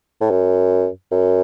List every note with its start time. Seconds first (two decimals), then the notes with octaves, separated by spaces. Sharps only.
0.21 A2
0.30 F#2
1.12 F#2